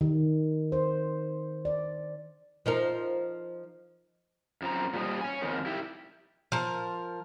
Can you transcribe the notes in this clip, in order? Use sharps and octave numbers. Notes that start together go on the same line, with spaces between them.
D#3
C5
D5
F3 D#4 A#4
F#2 F3 C4 A#5
A#2 F3 G3 D#5
C#5 G#5
F2 D#3
E4 G4
F3 A#4